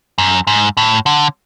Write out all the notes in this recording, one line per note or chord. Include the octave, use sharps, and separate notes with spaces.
F#2
G#2
A2
D3